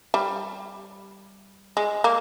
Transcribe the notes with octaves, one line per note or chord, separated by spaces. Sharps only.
G3
G#3
A#3